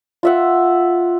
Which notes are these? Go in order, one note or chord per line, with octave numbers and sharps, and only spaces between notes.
F4 E5 F#5